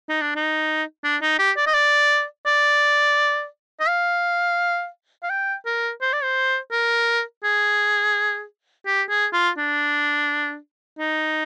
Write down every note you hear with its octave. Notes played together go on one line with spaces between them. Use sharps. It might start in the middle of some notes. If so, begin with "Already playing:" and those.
D#4
D4
D#4
D4
D#4
G4
D5
D#5
D5
D5
D#5
F5
F5
G5
A#4
C5
D5
C5
A#4
G#4
G4
G#4
F4
D4
D#4